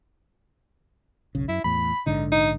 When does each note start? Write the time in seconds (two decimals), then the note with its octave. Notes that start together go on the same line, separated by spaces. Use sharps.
1.35 F#1 B1 C#3
1.48 F#2 E4
1.64 E2 A2 B5
2.06 A#1 G#2 D3 D#4
2.32 D#4